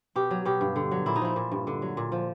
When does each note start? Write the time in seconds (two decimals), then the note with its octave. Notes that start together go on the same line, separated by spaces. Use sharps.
0.16 B2 G4
0.31 F#3
0.45 B2 G4
0.61 G2
0.76 D3
0.91 F#3
1.06 A#2 E4
1.16 D#4
1.22 F3 E4
1.36 A#2
1.52 G2
1.67 D3
1.82 F#3
1.97 A#2
2.12 F3